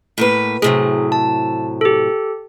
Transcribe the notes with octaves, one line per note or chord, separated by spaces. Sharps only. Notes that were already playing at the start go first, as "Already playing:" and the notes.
A2 A#3 B4
A2 C3 F#3 G#4
A5
G4 A4